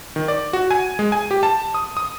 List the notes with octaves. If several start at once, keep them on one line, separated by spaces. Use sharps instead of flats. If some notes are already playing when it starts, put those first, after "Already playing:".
D#3
D5
F#4
G#5
G#3
G#5
G4
A5
D#6
D#6